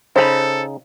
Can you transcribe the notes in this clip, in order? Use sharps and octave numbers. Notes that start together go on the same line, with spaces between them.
C#3 D#4 A4 C5 B5